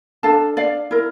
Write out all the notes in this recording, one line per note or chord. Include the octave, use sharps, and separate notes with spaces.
D4 A4 F5 A5
D5 F5
E4 A#4